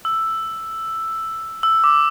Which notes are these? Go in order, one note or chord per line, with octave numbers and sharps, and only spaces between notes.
E6
E6
D6